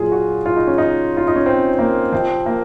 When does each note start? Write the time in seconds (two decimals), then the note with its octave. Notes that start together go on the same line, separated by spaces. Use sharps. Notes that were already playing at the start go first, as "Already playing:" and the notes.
Already playing: A#2 F#3 F4 G#4
0.12 F#4
0.46 F4
0.57 D#4
0.67 C#4
0.78 D#4
1.17 F4
1.28 D#4
1.36 C#4
1.46 C4
1.79 A#3
2.12 C3 F3 C4
2.46 A#3